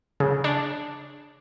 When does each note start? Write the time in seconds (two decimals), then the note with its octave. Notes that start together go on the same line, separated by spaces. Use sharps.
0.20 C#3
0.44 D4